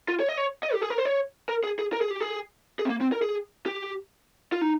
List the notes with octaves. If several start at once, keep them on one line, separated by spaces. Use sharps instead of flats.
F4
C#5
D#5
C#5
D#5
G4
G#4
A#4
C5
C#5
A#4
G#4
G#4
A#4
G#4
G4
G#4
G#4
C4
A#3
C4
A#4
G#4
G4
F4
D#4